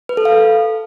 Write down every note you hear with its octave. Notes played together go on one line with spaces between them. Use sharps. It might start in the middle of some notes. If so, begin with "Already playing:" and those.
B4
A4
F5